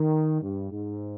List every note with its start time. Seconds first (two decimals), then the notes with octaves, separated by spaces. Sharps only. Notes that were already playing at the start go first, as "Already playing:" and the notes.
Already playing: D#3
0.42 G2
0.72 G#2